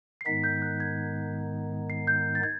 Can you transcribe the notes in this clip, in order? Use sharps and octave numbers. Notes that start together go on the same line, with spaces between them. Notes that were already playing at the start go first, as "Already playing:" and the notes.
C7
G#2 D#3 G#3 B3 D#4 B6
G6
F#6
G#6
C7
G6
A6
G#6